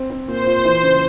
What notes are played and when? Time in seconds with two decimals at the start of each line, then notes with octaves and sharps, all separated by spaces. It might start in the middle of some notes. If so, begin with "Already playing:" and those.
Already playing: C4
0.10 C4
0.28 A#2 C5
0.47 F4
0.65 E3
0.83 C#3